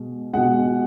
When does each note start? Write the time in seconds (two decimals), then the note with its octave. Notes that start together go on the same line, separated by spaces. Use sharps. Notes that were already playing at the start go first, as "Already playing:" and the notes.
Already playing: B2 G#3
0.33 B2 G#3 F#5